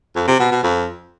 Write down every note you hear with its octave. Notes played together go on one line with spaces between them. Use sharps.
F2
C3
B2
B2
F2